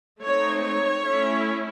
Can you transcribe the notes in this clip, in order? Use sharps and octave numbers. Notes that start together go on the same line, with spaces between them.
A3 C4 D#4 C#5
C#5
A3 C#4 E4